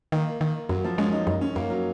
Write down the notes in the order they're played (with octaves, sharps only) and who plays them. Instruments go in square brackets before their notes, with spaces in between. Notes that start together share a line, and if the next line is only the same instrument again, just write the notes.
[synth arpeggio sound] D#3 [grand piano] A#3
[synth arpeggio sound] D#3
[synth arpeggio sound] F#2 [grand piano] F#3
[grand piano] F3
[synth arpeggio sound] G#3 [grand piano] C#4
[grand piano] D#4
[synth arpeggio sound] F#2 [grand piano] D#4
[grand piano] C#4
[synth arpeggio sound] F#2 [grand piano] A#3
[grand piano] F#3